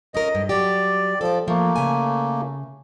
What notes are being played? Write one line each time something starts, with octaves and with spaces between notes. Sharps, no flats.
C#4 F4 A#4 D#5
G2
F#3 G4 D5
F3 A4 D5
F3 A3 A#3
C#3 G#5